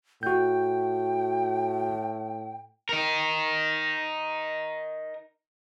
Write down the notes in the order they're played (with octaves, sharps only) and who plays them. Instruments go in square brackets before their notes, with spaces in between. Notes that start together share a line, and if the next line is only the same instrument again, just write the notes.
[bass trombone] A2 [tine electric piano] F#4 G6 [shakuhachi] G5
[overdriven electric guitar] D#4 A#4